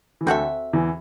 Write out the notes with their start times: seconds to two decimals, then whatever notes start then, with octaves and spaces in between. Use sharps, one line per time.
0.21 E3
0.26 D2 D3 C4 F#4 A4 E5
0.73 E2 E3